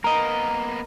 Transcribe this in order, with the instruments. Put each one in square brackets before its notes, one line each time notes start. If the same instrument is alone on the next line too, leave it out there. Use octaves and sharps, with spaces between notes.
[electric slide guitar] A#3 B3 [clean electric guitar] A#4 D#5 [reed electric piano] A#5